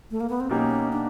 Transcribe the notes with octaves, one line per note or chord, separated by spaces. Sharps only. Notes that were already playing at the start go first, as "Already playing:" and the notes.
A3
A#3
B3
C4
B2 F#3 A#3 C#4 D#4 G4
D4